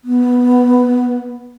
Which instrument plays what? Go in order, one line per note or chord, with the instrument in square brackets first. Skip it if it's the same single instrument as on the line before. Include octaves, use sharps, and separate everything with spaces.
[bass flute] B3